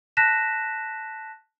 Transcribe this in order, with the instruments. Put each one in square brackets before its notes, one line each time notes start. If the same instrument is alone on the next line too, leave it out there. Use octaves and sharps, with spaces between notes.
[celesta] A5 F#6 A#6 B6 E7